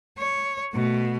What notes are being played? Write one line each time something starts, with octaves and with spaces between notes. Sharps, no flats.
C#5
B2 A3